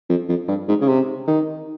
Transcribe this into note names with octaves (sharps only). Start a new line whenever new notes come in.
F2
F2
G2
G#2
C#3
C3
D#3